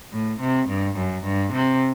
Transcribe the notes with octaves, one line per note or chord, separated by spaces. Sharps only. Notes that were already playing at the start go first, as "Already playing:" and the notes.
A2
C3
G2
F#2
G2
C3